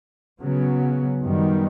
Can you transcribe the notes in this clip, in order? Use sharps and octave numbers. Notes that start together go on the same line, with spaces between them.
C#3 F#3 B3
F#2 D#3 G3 B3